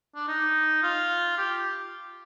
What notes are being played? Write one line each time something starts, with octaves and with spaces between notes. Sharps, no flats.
D4
D#4
F4
G4